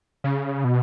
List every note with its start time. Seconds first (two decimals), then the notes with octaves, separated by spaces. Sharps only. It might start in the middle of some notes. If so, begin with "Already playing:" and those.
0.24 C#3
0.64 B2